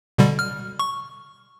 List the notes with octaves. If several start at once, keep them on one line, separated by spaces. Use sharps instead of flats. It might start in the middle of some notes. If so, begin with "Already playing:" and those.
B2 D3 G3
F6
C#6